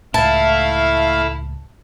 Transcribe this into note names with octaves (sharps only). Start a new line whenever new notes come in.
C#2 A2 A3 E4 F5 A5